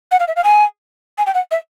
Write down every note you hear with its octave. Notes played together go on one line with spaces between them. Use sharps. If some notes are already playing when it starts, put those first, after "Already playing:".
F#5
F5
E5
F5
G#5
G#5
G5
F#5
E5